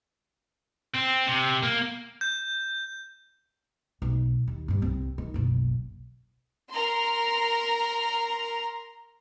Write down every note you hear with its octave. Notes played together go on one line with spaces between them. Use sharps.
C4
C3
A#3
G6
B1
D#2
G2 D3
C2 C4
D#3
F#1 B1
A#4 A#5 C6